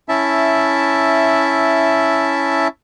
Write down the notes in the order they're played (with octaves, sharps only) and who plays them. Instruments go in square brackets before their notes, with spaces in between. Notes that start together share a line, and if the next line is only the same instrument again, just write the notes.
[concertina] C#4 E4 E5 A5